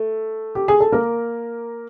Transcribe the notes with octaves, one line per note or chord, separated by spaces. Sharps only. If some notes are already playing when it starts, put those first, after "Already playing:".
Already playing: A3
G4
G#4
A4
A#3 A#4